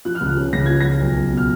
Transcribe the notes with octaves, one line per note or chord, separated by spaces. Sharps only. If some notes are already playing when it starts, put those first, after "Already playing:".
F3 F#6
F6
C#2 F#6
C#3
C#2 A#6
F3 G#6
C#2 A#6
B1
B1
B2
F6